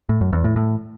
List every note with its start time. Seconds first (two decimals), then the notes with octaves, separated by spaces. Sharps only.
0.09 A2
0.21 F#2
0.33 E2
0.44 A2
0.56 A2